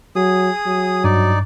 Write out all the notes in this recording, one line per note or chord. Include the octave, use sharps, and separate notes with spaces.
F#3 G#4 D#6
F#3
G2 D#4 D5